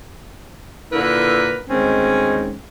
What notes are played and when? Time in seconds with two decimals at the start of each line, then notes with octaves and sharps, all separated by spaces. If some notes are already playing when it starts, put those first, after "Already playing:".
0.92 A#2 D3 E4 A#4 B4
1.68 D2 D#3 G#3 C4 C#4